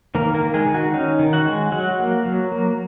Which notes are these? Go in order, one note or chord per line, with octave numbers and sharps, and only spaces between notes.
D#3 A#3 A#4
A#3 A#4
D#3
G#3 G#4
D#3
F#4
C#4 D#4
D#3
F#4 F#5
G#3
F#3 F#4 F#5
A#3
F#3
A#3